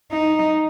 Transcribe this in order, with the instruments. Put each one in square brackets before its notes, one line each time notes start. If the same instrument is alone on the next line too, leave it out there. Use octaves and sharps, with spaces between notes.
[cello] D#4